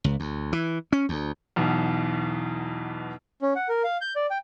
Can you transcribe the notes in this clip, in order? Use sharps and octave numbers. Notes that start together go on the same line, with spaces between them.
C#2
D2
E3
C#4
D2
B1 E2 B2
C#4
F#5
A#4
F5
G6
D5
G5